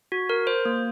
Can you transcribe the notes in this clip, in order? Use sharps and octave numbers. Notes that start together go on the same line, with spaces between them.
F#4
A#4
C5
A#3